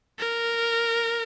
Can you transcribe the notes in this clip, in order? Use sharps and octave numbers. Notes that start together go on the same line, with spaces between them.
A#4